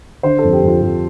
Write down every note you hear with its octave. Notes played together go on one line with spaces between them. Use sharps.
D3 C5
F2 A4
G4
F2 F4
F2 G4